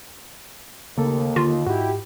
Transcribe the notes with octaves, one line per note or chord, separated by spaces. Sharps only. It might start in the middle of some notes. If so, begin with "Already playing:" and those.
D#2 C#3 A3 A#3 C#4 A4
D3 F4
G#2 D#4 E4 F#4 G4